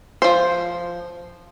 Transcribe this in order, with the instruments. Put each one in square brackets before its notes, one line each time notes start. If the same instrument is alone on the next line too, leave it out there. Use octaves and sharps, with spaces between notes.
[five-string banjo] F3 C5